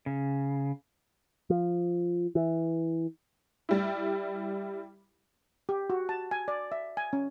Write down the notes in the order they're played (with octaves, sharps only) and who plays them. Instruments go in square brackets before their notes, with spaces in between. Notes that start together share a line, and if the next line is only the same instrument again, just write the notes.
[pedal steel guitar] C#3
[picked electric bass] F3
E3
[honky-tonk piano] G3 E4
[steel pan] G4
F#4
A5
G#5
D5
E5
G#5
C#4